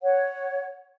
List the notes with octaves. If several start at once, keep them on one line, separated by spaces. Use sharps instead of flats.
C#5 F#5